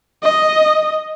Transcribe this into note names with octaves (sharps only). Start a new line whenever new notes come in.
D#5